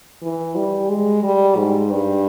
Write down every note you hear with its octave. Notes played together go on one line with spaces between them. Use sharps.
E3
G3
G#3
G3
G#2
G2